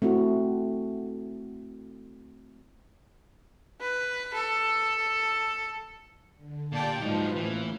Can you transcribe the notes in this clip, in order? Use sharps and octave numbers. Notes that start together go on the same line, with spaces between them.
A3 C4 E4 F#4
B4
A4
D3
A#2 G4 D5 G5 A5
G#2 F3 F#3 D#4 B4 C5 F5
A2 E3 A#3 C#4